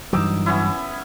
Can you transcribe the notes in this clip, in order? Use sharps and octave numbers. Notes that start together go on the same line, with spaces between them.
G2 E3 F#3 D#4 D6 E6
B3 C#4 E4